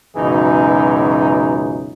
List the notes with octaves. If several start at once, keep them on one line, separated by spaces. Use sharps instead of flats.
C#2 F#2 B2 E3 D#4 G#4